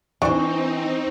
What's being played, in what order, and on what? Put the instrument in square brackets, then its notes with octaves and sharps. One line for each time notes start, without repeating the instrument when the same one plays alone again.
[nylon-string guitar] E3 [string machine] C4 D#4 [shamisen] D4 C5 [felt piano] C#6